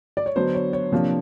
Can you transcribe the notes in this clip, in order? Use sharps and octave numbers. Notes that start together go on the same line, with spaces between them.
D5
C#5
D3 F#3 B3 D4 C5
C#5
C#5
C3 F3 A#3 D4